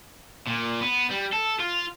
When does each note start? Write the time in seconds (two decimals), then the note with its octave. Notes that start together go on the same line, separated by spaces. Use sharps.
0.47 A#2
0.81 B3
1.11 G3
1.33 A4
1.60 F4